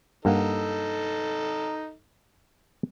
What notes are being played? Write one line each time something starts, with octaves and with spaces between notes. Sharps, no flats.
G2 A#3 D#4 A4 F#5